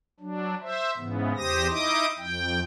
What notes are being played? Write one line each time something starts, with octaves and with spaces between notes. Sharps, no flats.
F#3 D4
C5 E5
G#2 C#3 E3 B3
E2 G4 C5 D#6 A#6
D#4 E4 D#5 D6 D#6
F2 G5